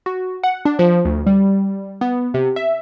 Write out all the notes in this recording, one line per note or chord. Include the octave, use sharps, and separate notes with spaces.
F#4
F#5
D4
F3
D2
G3
B3
C3
E5